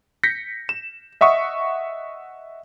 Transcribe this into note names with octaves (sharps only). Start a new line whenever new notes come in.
G6 A#6 B6 C#7
E7
D#5 E5 F#5 C#6 D#6